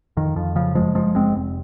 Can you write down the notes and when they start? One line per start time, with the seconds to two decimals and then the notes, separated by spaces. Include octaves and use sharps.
0.17 F2 D#3
0.36 F2 F3
0.56 C#3 F3
0.75 F#1 F3 G#3
0.95 F#1 F3 G#3
1.15 F#1 G#3 C4
1.35 F1